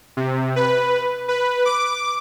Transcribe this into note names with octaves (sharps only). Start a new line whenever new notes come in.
C3
B4
B4
D6